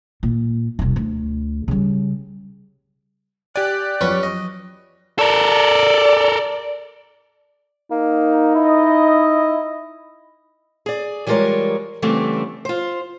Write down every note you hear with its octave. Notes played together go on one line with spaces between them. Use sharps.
A#2
E1 C2
D2
C#3 G3
G4 D5 G#5 F#6
F3 F#3 C#4 B4 C#6
D#5
A4 A#4 D5
A#3 D#4
E4 D#5
G#4 D5
E3 G3 G#3 F4 A#4 C#5
C#3 E3 G3 A3 B3 C4
F4 C5